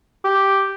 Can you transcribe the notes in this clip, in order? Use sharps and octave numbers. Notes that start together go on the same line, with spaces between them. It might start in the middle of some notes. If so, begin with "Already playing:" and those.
G4